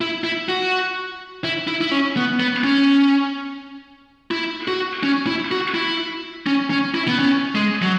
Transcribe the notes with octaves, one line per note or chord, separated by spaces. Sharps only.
E4
E4
F#4
E4
E4
E4
C#4
B3
B3
C#4
E4
F#4
C#4
E4
F#4
E4
C#4
C#4
E4
B3
C#4
G#3
F#3